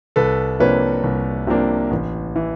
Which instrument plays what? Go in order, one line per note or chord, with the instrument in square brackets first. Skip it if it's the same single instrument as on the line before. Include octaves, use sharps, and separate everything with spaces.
[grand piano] C2 A4 B4
C3 F3 A#3 D4 B4 C#5
C2
C3 F3 A#3 D4
A1
E3